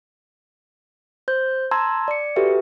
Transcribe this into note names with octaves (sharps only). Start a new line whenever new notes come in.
C5 G6
A5 A#5 C6 E6 G#6
D5 C#7
F#4 G4 A4 B4 E5